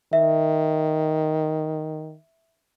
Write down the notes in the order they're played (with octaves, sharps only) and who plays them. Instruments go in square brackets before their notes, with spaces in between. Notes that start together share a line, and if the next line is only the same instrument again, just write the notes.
[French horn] D#3 [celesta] E5